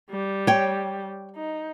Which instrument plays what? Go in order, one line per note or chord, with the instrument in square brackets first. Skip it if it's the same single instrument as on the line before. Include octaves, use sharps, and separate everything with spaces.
[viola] G3
[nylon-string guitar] C#5 G5
[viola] D#4